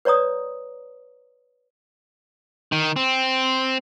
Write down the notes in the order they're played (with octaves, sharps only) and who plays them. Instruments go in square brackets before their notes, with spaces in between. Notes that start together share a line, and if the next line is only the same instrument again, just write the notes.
[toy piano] B4 C#5 D5 A#5 D#6
[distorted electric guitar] D#3
C4